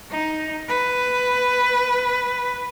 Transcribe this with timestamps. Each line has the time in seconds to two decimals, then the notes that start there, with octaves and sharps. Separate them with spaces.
0.11 D#4
0.68 B4